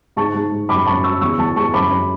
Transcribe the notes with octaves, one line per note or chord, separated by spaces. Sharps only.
G#2 A5 C#6
G#2
G#3
F#2 B5 D6
F#2 A5 C#6
F#3 C#6 E6
E2 C#6 E6
E2 A5 C#6
G#3 A5 C#6
F#2 B5 D6
F#2